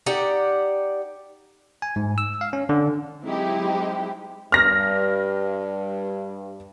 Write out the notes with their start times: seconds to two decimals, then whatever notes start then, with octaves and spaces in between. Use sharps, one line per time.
0.06 D#4 G4 D5 F#5
1.82 G#5
1.96 G#2
2.18 E6
2.41 F5
2.53 C#4
2.69 D3
3.23 F#3 G#3 C4 D#4 E4 G4
4.52 G2 F6 A#6